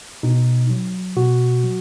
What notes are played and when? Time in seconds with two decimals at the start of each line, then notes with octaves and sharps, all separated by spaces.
0.23 B2 D#4
0.70 F#3
1.16 B2 F#4
1.64 F#3